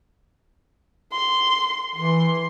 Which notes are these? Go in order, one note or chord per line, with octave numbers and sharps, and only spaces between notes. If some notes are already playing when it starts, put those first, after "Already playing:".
C6
E3 C6